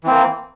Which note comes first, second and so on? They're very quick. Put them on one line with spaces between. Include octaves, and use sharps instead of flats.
E3 C4 A#3